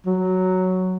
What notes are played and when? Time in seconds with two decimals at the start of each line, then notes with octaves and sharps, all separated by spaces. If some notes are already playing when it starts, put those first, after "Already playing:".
0.06 F#3